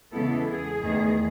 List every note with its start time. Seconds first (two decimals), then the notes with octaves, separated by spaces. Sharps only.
0.13 E2 C#3 G#3 B3 E4 A4
0.47 G#4
0.82 E2 D#3 A3